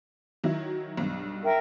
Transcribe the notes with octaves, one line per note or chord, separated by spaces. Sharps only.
D#3 F#3 E4
B1 G2
A#4 E5 G5